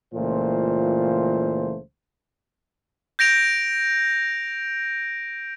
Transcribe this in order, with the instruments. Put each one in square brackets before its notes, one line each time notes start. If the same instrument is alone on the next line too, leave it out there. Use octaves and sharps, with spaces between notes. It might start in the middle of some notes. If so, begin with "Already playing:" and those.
[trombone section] C#2 A#2 E3 A3 F4 C5
[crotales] G6 A#6 D7 F7